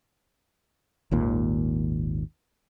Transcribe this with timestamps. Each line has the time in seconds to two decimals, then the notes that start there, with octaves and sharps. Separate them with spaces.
1.11 G#1 D#2 A#2